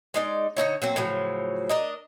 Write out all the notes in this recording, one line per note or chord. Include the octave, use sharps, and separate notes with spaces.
G#3 D#4 D5
D3 D#4 E4 C#5
F#3 A#3 C4
A2 C#3 F3 F#3
D4 A#4 D#5